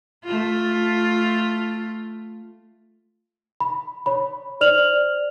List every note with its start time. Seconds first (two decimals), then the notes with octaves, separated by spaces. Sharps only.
0.25 A3 F4
3.60 B5
4.06 C#5 B5
4.61 C5 D5 F6 F7 F#7